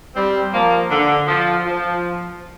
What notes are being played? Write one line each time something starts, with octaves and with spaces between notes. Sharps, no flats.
G3 C4
F3 A#3
D3
F3
F3